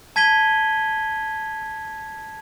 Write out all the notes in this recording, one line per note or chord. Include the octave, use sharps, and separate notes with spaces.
A5 G#6 B6 D#7 G7